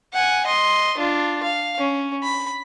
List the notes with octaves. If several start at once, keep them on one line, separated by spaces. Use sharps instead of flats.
F#5 G#5
D#5 C6
D4 F4
F5
C#4
B5